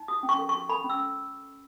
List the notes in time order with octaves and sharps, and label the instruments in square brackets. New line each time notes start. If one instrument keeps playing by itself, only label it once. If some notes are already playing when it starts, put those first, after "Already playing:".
Already playing: [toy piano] D#4
F#4 D#6
C#4
C#6
A4
C#6
F#4
A4 B5
C#4
E6